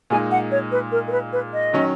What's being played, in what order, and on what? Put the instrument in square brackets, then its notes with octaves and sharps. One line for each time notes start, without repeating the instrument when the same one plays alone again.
[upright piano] A#2 G#3 D#4 [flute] G#5
[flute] F#5
C#5
B4
A#4
A#4
B4
B4
D#5
[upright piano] D#3 F#3 C#4